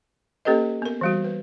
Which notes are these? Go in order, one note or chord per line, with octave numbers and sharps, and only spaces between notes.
A#3 C#4 G4 A4 B4 D#5
B3 A#4
E3 G3 F#4
B4